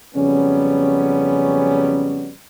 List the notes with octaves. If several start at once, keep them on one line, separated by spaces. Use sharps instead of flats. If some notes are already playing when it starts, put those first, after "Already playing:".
F2 C#3 F#3 G3 B3 C#4